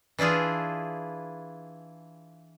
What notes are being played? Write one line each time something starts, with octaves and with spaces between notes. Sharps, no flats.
E3 D4 E4 F4 G#4